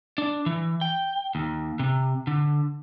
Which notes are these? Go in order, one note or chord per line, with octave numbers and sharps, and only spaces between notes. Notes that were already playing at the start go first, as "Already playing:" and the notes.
D4
E3
G5
D#2
C3
D3